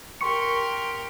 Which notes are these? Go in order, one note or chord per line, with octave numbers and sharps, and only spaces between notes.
G4 A#4 C6 C#6 C#7